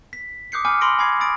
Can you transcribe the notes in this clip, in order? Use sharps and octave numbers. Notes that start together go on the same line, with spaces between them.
B6
D6 D#6 F#6 G6 C7 C#7
G#5 B5 D6 F6 G6 C#7
B5 C6 E6 A#6 D7
G#5 B5 D6 G#6 C7 D7
B5 C#6 D#6 A6 D7